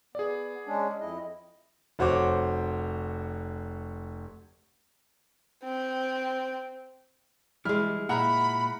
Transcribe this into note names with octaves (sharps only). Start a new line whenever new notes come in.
B3 G#4 D5
G#3 C#4 D4
F2 E4 D#5
F1 F#4 C5 C#5 D6
C4
E3 G3 G#3 E4 F6
A#2 E4 E5 F#5 A#5 B5